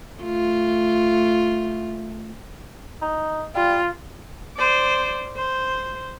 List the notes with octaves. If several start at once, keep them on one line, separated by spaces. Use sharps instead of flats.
A3 F4
D#4
G3 F4
C5 D5
C5